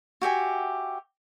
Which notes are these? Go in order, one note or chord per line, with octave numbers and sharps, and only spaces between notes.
F#4 G4 E5 G#5